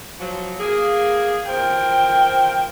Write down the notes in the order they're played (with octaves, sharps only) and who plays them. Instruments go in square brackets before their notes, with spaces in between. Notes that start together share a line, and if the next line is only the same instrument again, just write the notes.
[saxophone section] F3 F#3
A#3 G#4
[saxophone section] F4 A#4 C5 [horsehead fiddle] G5